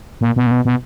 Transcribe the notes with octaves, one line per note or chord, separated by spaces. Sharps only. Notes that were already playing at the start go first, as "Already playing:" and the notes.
A#2
B2
A#2
B2
B2